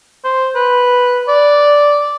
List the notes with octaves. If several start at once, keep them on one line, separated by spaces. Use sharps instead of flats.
C5
B4
D5